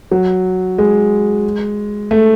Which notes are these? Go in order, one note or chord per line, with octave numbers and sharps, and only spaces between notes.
F#3
G#3
A3